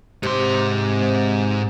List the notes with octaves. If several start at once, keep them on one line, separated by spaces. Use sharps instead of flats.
G#2 C3 C6